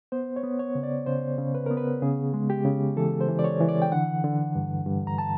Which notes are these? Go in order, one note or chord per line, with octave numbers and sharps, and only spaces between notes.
B3 C5
C#5
B3
C#5
C#3
D5
C#3 C5
C#3
B4
B3 A#4
B4
C#3 G#4
G#3
G4
C#3
E3 A4
C5
E3
D5
C#5
E3
D5
G5
D3 F#5
D3
G2
G2
A#5
A5